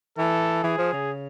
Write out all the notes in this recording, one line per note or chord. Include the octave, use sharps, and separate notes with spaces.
E3 A4
E3 G#4
F3
C#3